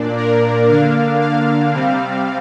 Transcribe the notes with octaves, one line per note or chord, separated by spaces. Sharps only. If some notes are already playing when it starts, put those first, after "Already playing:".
Already playing: A#2 A#3 D4 D5
A#4
D3 A#3 D4 F5
F5
C3 G3 C4